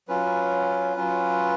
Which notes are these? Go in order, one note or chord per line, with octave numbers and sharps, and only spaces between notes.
F#3 C#4 F4 B4
F#3 C#4 F4